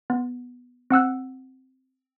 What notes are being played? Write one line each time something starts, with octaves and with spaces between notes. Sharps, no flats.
B3
C4 F#5 E6 F#6